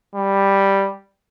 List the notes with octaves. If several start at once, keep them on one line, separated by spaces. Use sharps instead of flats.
G3